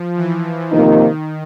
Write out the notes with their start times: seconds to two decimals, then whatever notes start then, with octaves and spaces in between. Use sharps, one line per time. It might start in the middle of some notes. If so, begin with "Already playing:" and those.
Already playing: F3
0.17 E3
0.72 C3 D#3 F3 A#3 D#4